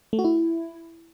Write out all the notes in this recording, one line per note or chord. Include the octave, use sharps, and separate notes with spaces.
A3
F#4
E4